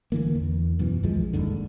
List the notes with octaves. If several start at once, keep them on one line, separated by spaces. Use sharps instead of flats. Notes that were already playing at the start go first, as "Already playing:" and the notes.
D3 E3 A#3
E2
F#2 B2 E3
A#1 D#2 F3 G#3
D#1 D#2 G#2 D3